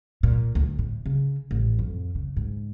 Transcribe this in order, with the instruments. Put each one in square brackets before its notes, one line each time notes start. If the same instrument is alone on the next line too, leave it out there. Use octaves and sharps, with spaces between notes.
[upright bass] A#2
D2
A2
C#3
A1
F2
C#3
G#2